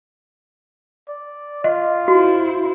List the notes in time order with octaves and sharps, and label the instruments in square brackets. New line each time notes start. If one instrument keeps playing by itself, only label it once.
[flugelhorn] D5
[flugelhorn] F4 [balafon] D#5
[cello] E4 C5 [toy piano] F#4